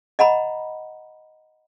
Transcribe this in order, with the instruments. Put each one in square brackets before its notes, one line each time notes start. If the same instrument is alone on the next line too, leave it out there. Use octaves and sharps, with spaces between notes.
[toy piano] D#5 F#5 A#5 B5